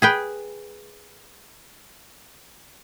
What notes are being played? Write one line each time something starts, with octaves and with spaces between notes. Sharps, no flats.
G#4 B4 G5